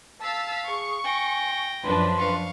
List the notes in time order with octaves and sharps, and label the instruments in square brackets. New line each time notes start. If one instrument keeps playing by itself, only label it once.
[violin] F5 [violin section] A5 E6 B6
[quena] G#4 [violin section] C#6
[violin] G5 A#6 [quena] G#5
[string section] F#2 F3 D4 [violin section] B4 [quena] C6
[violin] F5 C#6